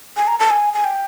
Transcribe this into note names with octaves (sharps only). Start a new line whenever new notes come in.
G#5
A#5
A5
G#5
G#5
G5